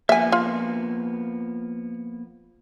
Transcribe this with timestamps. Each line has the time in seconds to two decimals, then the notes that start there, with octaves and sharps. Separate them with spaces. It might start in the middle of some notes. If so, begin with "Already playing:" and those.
0.09 F3 A#3 B3 E5 G#5
0.32 F4